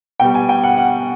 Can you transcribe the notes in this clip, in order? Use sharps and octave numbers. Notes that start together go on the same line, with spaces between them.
B2 G3 G5
G#5
G5
F#5
F#5